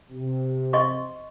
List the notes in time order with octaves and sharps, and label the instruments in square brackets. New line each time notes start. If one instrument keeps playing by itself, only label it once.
[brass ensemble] C3
[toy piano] D#5 C6 C#6